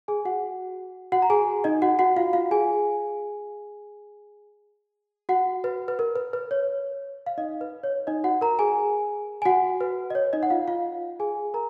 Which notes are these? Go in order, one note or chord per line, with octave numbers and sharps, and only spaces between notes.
G#4 G#5
F#4 F#5
F#4 F#5
A#5
G#4 G#5
D#4 D#5
F#4 F#5
F#4 F#5
F4 F5
F4 F5
G#4 G#5
F#4 F#5
B4
B4
A#4
B4
B4
C#5
F5
D#4 D#5
B4
C#5
D#4 D#5
F#4 F#5
A#4 A#5
G#4 G#5
G#5
F#4 F#5
B4
D#5
C#5
D#4 D#5
F#5
F4 F5
F4 F5
G#4 G#5
A#4 A#5